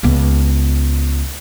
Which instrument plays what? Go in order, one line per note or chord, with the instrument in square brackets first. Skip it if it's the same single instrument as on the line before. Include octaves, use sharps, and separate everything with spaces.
[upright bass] C#2 B3